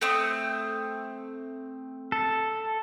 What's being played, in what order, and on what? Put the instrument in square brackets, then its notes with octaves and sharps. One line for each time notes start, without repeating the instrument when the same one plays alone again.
[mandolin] A3 C4 D#6
[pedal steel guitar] A4